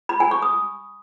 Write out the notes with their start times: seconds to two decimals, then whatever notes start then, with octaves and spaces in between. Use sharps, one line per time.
0.09 B5
0.20 G#5
0.31 C#6
0.42 D#6